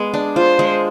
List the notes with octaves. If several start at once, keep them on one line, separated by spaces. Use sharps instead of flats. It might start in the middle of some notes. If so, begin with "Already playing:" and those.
Already playing: G#3 B3
D4
F4 C5
G#3